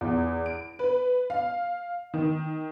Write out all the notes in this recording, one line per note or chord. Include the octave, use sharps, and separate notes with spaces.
E2
D7
B4
F5
D#3